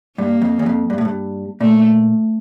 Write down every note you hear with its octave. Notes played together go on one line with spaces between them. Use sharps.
G2 A#3
F2
E2
F2
G2
A2
G2
A#2 A3